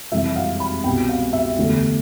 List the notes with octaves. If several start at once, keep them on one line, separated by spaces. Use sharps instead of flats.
F2 C3 E3 G3 E5
F5
B5
C2 B2 B3 G5
F5
E5
E2 D3 A3